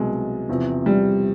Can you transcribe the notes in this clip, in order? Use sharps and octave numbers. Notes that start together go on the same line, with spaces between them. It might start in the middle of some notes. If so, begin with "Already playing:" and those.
Already playing: C2 B2 F#3 G#3
E2 C3 F3
G3